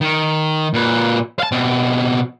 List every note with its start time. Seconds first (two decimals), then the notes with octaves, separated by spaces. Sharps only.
0.01 D#3
0.74 A#2 B4
1.39 F5 A5
1.52 B2 C4